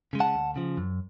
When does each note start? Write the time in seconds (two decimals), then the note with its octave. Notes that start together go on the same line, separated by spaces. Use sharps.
0.13 C#3 G#3
0.20 F#5 A5
0.35 D2
0.56 C#3 F3
0.78 F#2